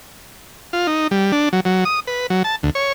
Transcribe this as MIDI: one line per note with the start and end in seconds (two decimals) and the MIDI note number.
0.73 0.87 65
0.87 1.07 63
1.11 1.32 55
1.32 1.49 62
1.53 1.60 54
1.65 1.84 54
1.85 2.00 87
2.07 2.27 71
2.30 2.43 54
2.44 2.56 81
2.63 2.70 38
2.75 2.92 73